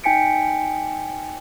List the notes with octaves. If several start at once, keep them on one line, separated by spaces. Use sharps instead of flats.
D#4 G5 G#5 B6 C#7 D7